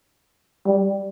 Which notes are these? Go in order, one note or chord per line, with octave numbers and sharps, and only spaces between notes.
G3